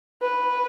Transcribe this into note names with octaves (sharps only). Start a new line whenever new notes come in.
B4